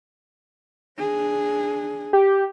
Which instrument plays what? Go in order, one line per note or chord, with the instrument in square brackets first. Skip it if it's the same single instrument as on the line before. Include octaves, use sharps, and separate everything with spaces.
[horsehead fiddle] D4 G#4
[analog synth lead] G4